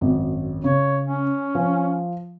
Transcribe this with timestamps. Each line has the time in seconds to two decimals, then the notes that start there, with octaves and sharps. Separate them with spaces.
0.01 G#1 F#2
0.64 C#3 C#5
1.04 C#4
1.55 F3